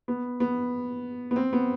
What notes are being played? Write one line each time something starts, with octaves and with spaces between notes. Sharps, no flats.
B3
B3
B3
C4
B3